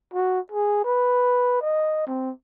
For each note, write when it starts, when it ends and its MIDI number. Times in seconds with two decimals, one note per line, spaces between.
0.14 0.39 66
0.52 0.80 68
0.84 1.59 71
1.61 2.03 75
2.07 2.31 60